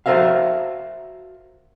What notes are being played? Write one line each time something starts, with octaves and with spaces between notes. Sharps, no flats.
F#4 A#4 C5 E5 F5